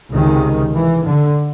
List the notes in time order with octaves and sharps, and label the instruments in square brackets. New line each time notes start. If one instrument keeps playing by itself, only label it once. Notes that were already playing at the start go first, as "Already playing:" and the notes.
[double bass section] C#2 C3 D#3
E3
D3